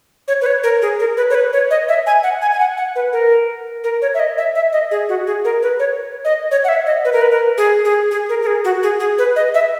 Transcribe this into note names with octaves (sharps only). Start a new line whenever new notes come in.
C#5
B4
C#5
A#4
G#4
A#4
B4
C#5
B4
C#5
D#5
E5
G#5
F#5
G#5
G#5
F#5
F#5
B4
A#4
A#4
C#5
E5
D#5
E5
E5
D#5
G#4
F#4
G#4
A#4
B4
C#5
D#5
C#5
F#5
E5
D#5
B4
A#4
B4
A#4
G#4
G#4
G#4
A#4
A#4
G#4
F#4
G#4
G#4
B4
D#5
E5